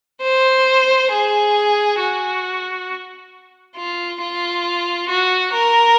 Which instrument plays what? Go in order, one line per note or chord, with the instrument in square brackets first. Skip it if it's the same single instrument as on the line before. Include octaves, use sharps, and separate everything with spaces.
[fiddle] C5
G#4
F#4
F4
F4
F#4
A#4